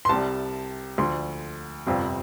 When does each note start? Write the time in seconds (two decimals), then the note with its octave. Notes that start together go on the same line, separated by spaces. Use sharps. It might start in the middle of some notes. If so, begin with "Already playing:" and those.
0.05 C6
0.09 C2 C3 G3 A5
0.98 D2 D3 F3 C6
1.87 G1 F2 C3 G3 C4